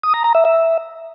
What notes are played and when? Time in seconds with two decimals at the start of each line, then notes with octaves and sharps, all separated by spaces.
0.03 D#6
0.14 A#5
0.24 A#5
0.35 E5
0.45 E5